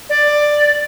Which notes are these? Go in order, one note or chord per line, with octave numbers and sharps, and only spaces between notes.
D5